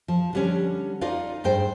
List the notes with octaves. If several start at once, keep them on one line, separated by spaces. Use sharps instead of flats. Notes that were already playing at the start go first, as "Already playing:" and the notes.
F3
D3 G3 C#4
D#4 F4 D5 F5
G2 G#4 C5 G5